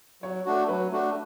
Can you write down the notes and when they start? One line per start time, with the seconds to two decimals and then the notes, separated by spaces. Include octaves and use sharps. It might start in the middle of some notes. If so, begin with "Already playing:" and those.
0.22 F#3 C#5
0.45 A3 D4 F#4
0.68 F#3 B4
0.92 A3 D4 F#4